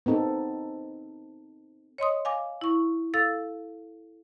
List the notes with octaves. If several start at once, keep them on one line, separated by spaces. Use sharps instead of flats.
B3 C4 D#4 A4
C#5 D#5 C6 D#6
F5 G#5 D6
E4 C#6
A4 F5 E6 A6